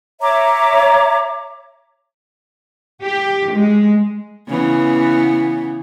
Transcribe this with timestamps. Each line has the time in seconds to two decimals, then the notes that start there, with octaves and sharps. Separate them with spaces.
0.21 C#5 E5 A#5 D6
3.03 G4
3.54 G#3
4.49 C#3 E3 B3